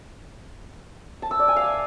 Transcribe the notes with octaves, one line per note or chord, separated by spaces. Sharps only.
A5
E6
D5
G#5
F5